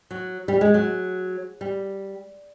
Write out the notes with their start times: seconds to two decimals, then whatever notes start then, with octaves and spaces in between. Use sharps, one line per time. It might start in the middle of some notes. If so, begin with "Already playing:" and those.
0.11 F#3
0.48 G3
0.61 G#3
0.74 F#3
1.61 G3